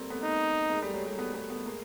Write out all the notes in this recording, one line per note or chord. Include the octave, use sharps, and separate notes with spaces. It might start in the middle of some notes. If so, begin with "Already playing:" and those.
Already playing: G3 A3 A#3 C4
A3 B3
D#4
G#3 A#3
G3 A3
F#3 G#3
G3 A3
A3 B3
A3 B3
A3 B3
G#3 A#3